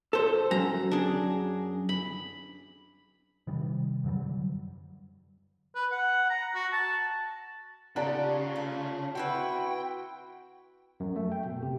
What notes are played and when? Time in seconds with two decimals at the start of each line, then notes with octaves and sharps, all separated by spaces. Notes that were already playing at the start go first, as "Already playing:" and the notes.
0.13 A4 C5
0.51 F#2 A#5
0.91 D4 G#4
1.89 B5
3.47 C3 D#3 G3
4.04 F#2 D3 F#3 G3
5.75 B4
5.91 F#5
6.30 A#5
6.54 F#4
6.72 A5
7.96 C#3 D4 D#4 F4 G4 D5 F#5 A#5
8.56 A3
9.15 C4 E4 F#4 B4 G5
11.00 F#2
11.16 A3
11.32 G5
11.46 B2
11.62 C3